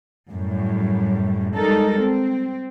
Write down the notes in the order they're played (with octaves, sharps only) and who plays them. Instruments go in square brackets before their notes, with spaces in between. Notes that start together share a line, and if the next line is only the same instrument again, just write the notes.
[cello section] F#2 A2 G3
G3 G#3 D#4 A4 A#4
C4